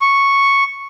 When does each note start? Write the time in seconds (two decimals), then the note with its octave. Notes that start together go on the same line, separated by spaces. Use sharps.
0.01 C#6